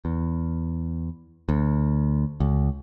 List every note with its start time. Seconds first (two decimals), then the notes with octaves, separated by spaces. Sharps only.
0.05 E2
1.49 D2
2.40 C#2